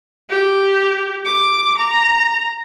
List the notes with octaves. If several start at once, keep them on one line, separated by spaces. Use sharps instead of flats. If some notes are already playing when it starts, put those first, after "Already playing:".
G4
D6
A#5